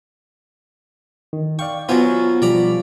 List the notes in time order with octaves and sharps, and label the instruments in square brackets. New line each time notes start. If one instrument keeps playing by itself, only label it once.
[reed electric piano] D#3
[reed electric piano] D5 F5 G5 [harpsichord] C#6
[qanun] F#3 F4 [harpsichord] B3 E5 [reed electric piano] C5 G#5
[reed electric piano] B2 F3 G3 [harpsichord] D5 A#5 B5